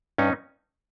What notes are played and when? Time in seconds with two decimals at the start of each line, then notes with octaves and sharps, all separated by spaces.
0.18 G2 C#4 D#4